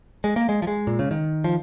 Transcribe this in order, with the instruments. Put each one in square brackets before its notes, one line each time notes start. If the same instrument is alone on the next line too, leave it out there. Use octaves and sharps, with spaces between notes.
[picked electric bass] G#3
A#3
G#3
F3
G#3
A#2
C#3
D#3
F3